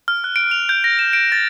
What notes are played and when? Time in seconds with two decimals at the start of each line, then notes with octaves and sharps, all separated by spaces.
0.08 F6
0.24 F#6
0.36 D7
0.51 F7
0.69 G6
0.84 A#6
0.99 E7
1.13 D7
1.32 A6